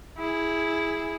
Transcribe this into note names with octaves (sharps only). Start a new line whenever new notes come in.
E4 G#4